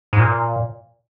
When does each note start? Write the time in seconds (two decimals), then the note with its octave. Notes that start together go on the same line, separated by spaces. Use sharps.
0.13 G#2
0.19 A#2